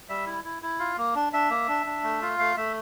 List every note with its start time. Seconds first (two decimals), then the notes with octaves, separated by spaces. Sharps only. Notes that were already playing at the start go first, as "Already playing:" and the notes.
0.09 G3 E5
0.26 E4
0.44 E4
0.63 E4
0.79 F4
0.98 A#3
1.15 D4
1.33 D4 E5
1.50 A#3
1.68 D4
1.86 D4
2.03 A3
2.22 F4
2.39 A3 F5
2.57 A3 E5